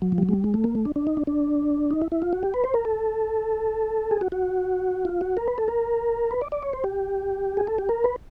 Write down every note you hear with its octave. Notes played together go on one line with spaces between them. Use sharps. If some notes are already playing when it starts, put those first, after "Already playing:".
F#3
F3
G3
F#3
G#3
G3
G#3
A3
A#3
A3
D4
D4
D#4
D4
D4
D#4
E4
E4
F4
F#4
G4
B4
C5
A#4
A4
G#4
F#4
F#4
F4
F#4
A#4
B4
A4
A#4
B4
D5
D5
C#5
C5
G4
G#4
A4
G4
A#4
B4